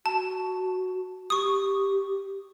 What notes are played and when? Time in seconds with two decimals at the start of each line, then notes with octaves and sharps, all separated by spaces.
0.06 F#4 A5
1.30 G4 C#6 D#6